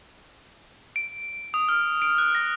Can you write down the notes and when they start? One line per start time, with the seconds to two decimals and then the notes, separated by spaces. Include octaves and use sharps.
0.96 D7
1.54 D#6
1.69 F6
2.02 D7
2.18 F#6
2.35 A#6